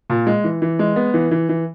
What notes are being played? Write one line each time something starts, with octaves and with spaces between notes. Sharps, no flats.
A#2
G#3
E3
E3
G#3
B3
E3
E3
E3